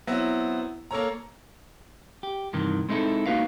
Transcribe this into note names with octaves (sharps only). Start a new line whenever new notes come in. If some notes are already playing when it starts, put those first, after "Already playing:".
F#3 B3 C4 E4
A#3 A4 C#5 A#5
G4
G2 C3 D#3 E3
G#3 C4 D#4 E4 A4
A#3 D4 D#4 F#4 B4 F5